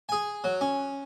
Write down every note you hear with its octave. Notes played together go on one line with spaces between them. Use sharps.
G#4 G#5
F#3
C#4